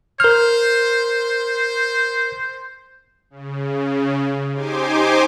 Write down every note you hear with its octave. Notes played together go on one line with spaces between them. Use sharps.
A#4 C5 F6
C#3
D#4 G4 C5 G#5 C6 D6